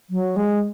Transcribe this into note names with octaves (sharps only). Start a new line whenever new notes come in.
F#3
G#3